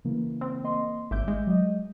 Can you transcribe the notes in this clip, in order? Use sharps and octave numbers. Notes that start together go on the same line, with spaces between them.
C#3 E3 A#3
C4
A#3 D#5 C6
G#1 E5 D6 G6
G#3
F#3 D#5